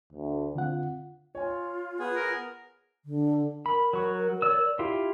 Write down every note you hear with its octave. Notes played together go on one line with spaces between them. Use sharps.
D2
D3 C4 F4 F#5
F4 C#5 G#5
B3 G#4
A#4
D3
A#4 B5
F#3 C#6
C#5 D5 E6
E4 F4 G4